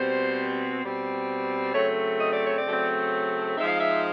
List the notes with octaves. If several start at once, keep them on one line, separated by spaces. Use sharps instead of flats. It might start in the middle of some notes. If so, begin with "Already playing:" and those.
Already playing: B2 G3 C4 C5
B2 G3 C4
C#3 F#3 A3 C4 C#5
D#5
D5
C#5
D5
C#3 F#3 A3 C4
F3 G#3 C4 D#4 E5
F5
E5